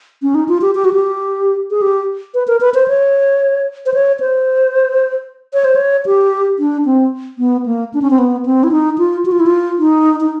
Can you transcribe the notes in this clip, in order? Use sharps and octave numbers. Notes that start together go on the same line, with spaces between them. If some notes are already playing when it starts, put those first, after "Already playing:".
C#4
D#4
F4
G4
G4
F#4
G4
G#4
G4
B4
A#4
B4
C5
C#5
C5
C#5
C5
C#5
C5
C#5
G4
D4
C4
B3
A#3
D4
C#4
C4
B3
C4
E4
D#4
F4
F#4
F4
E4
F4
D#4
D#4